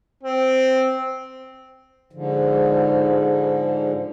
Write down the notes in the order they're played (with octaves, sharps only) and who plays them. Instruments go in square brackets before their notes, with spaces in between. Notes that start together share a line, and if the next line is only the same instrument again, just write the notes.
[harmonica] C4
[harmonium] G#2 D3 F3